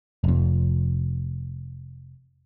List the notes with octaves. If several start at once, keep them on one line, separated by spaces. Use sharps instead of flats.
F1 F2